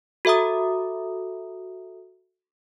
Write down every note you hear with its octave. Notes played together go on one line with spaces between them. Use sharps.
F#4 A4 E5 A#5 D#6